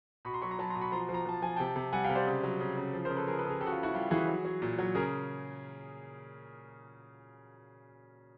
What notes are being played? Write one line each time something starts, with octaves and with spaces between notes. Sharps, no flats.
B2 B5 C#6
A#5 C6
F#3 B5 C#6
A#5 C6
F#3 A5 B5
A#5 C6
B2
B5 C#6
F3 A#5 C6
F3
A#5
F3 A5
F3 G#5
C3 G5 A5
C3
G3 F#5 G#5
F5 G5
C3
C5 D5
C#3
F#3
C#3
C#3
F3
A#4 C5
C#3
A4 B4
F3 G#4 A#4
A4 B4
C#3 G#4 A#4
C#3 G4 A4
F#4
F4
C#3
E4 F#4
G3 F4 G4
E3 F#4 G#4
F#3
F#3
A#2
F#3
C#3 G#4 A#4